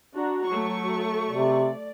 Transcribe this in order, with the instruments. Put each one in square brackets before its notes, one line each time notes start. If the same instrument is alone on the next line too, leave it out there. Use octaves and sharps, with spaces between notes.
[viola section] D4 F#4 A#5
[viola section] F#3 [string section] A3 C#6
[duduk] C3 [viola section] D5